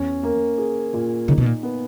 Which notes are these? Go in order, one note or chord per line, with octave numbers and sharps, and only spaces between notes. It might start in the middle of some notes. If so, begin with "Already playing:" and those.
Already playing: E2 C#4
A#3
G#4
A#2
C#3 D#4
B2
A#2
B3